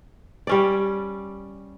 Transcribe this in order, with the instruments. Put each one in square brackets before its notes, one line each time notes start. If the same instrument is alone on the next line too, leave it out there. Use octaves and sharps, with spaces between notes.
[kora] G3 C#4 D5